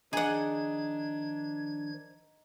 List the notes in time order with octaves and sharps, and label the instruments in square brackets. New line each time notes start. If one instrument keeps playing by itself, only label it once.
[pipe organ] D#3 F3 G#6 [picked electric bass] D4 [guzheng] D#4 D5 [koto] G#4 F#5